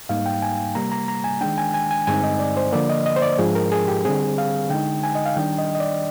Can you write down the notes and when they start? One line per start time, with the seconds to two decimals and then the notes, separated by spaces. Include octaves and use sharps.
0.09 G#2 G3 A#3 D#4 F5
0.26 G5
0.42 G#5
0.75 C3 G3 A#3 A#5
0.92 A#5
1.08 A#5
1.24 G#5
1.41 D#3 G#3 D4 G5
1.58 G#5
1.74 G#5
1.91 G#5
2.07 G2 D3 G#3 C4 D#4 G#5
2.24 D#5
2.40 D5
2.57 C5
2.72 D3 F3 A#3 D5
2.89 D#5
3.06 D#5
3.16 C5
3.22 D5
3.39 G#2 F3 G#3 D4 G#4
3.55 A#4
3.72 G#4
3.88 G4
4.05 D3 G3 C4 G#4
4.38 F5
4.70 D3 G#3 D#4 G5
5.03 G#5
5.15 D#5
5.26 F5
5.36 D#3 G3 D4 G5
5.59 D#5
5.75 D#5
5.80 D5